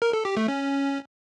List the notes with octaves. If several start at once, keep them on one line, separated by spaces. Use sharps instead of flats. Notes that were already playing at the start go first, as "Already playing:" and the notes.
A#4
A4
G4
A3
C#4